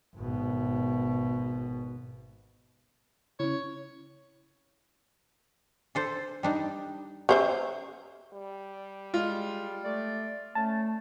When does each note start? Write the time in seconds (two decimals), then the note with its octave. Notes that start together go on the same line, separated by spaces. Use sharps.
0.16 G#1 B2
3.40 C#3 C#4 E4 C#5
5.95 D4 A4 C5
6.43 G3 D4 D#4
7.29 C#4 G4 C5 C#5 E5
8.33 G3
9.14 G#3 F4
9.83 A3 D5
10.55 A3 C#4 A5